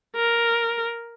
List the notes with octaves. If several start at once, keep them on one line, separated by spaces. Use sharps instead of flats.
A#4